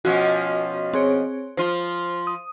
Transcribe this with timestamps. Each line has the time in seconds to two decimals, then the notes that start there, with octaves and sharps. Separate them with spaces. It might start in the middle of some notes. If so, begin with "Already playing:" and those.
0.05 B2 F3 C#4 F#4
0.93 C4 G#4 C#5
1.57 F3 F4 C5
2.27 D#6